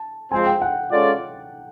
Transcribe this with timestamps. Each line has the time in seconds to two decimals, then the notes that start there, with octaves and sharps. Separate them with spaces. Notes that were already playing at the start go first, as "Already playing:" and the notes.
Already playing: A5
0.32 F3 G#3 C4 G#5
0.46 G5
0.62 F#5
0.91 G#3 C#4 F4 A4 D5